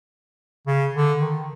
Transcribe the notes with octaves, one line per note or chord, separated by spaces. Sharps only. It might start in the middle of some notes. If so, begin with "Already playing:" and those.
C#3
D3
D#3